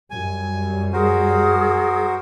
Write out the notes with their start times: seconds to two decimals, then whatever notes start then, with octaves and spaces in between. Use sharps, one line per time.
0.11 F#2 G3 G#5
0.93 F#4 G#4 A#4 C5